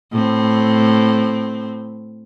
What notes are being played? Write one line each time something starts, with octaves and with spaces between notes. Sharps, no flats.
A2 C4